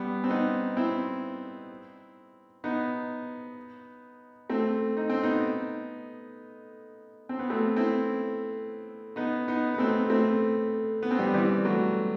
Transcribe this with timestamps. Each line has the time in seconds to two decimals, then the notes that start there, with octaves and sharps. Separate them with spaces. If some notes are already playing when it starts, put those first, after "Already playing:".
Already playing: G3 B3
0.24 C4
0.30 B3 D#4
0.77 C4 E4
2.64 B3 D#4
4.50 A3 C4
4.97 D#4
5.10 C4
5.23 B3 D#4
7.29 C4
7.39 B3
7.50 A3 C4
7.76 C4 E4
9.16 B3 D#4
9.48 B3 D#4
9.74 B3
9.78 A3 C4
10.10 A3 C4
11.02 B3
11.11 C4
11.19 G3 B3
11.34 E3 G3
11.65 F#3 A3